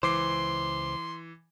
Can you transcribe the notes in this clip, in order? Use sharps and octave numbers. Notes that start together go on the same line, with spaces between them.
C#2 E3 C5 C6 D6 C7